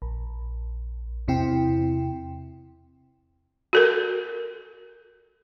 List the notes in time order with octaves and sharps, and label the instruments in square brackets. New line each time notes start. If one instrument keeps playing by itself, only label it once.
[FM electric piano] A#1
E2 C3 C4 E4 G5
[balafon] F#4 A4 A#4